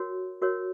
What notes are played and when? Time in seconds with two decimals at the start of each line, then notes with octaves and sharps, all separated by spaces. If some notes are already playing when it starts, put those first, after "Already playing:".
Already playing: F#4 A#4 C#5
0.42 F#4 A#4 C#5